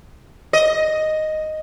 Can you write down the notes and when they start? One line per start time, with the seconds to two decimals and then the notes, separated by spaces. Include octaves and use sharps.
0.53 D#5